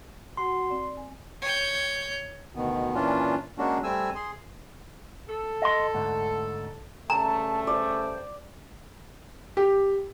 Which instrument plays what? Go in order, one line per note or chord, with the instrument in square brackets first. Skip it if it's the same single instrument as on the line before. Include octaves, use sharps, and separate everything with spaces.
[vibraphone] F#4 F#5 [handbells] C6
[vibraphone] C4 D5
G#5
[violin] C#5 G6
[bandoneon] D2 B2 D#3 B3
A#2 E3 C#4 D4 F4
G#3 A#3 C#4 D4 F#4
G3 A3 C4 G#5 E6
G#4 C6
[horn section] A4
[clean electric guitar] D#5 C6
D2 G#2
[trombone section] G2 C#3 A3 [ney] A5 [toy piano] A#5
[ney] C5 [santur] D5
[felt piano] G4